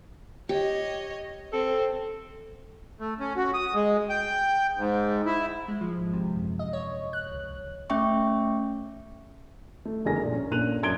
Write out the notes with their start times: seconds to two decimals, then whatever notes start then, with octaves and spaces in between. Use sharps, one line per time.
0.49 G4 C#5 D#5
1.53 C4 A4
3.00 A3
3.20 C#4
3.36 F#4
3.54 D#6
3.74 G#3
4.09 G5
4.78 G#2
5.26 E4
5.68 G#3
5.81 F3
5.97 G#1
6.13 C3
6.36 F#2
6.59 D#5
6.73 C#5
7.13 F#6
7.32 C#2
7.90 A3 C#4 E5 G5 C#6
9.85 A3
10.05 G1 F2 G#4 A#4 G#5 A#6
10.19 G2 A#2
10.33 C#4
10.51 G2 A#2 A#3 F#6 D#7 F7
10.83 F#2 C#4 C6 G#6 D7 G7